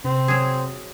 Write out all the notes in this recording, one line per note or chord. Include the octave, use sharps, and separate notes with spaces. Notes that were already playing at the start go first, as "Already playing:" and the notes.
C3 C4
F#3 G#4